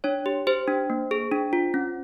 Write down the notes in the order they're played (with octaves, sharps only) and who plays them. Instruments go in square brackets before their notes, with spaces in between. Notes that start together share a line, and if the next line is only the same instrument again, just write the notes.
[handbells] D4 C#5
G4
G4 C5
D4
A#3
G#4
D4
F4
C#4